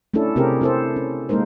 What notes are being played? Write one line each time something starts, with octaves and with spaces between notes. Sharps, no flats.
A3 C#4 D4 E4 A4
C3 C4 C#4 G4 G#4 A#4
C4 E4 A4 A#4 C5
C#4
G#3 A#3 D#4 A#4 C5